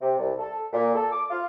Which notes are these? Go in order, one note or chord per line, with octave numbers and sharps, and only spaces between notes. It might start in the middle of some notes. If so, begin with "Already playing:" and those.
C3
C2
A4
A#2
A4
D6
F4